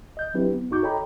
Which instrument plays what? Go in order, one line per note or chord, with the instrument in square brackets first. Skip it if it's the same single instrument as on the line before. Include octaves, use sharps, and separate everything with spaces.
[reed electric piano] D#5 G6
F#3 C4 D4 E4 G4 B4
B3
G2 D#4 F#4 C#6 D6 G6
A4 C#5 D#5 G5 A#5 B5